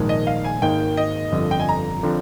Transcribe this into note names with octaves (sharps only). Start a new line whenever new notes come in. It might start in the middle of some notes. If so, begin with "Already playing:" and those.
Already playing: A#1 G#2 D#3 G#3
D#5
F5
G#5
G#1 G#2 D#3 A#3 D#4 G5
D#5
G1 F2 D3
G5
G#5
A#5
D3 F3 C4